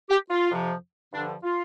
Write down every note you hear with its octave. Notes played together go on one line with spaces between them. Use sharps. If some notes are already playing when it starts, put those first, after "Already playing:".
G4
F4
F2 C3 F3
G2 D3 F3 D4
F4